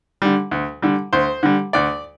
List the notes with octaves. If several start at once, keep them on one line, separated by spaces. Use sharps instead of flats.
D3 G3
D2
D3 G3
D2 C5
D3 G3
D2 D5